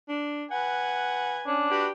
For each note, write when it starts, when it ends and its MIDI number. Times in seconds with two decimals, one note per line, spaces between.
0.09 0.45 62
0.51 1.49 71
0.51 1.38 78
0.51 1.49 80
1.47 1.66 61
1.47 1.89 62
1.71 1.87 66
1.71 1.92 67
1.71 1.87 71
1.71 1.87 78